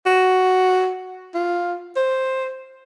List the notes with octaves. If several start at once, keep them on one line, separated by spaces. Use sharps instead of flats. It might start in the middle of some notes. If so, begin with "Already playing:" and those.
F#4
F4
C5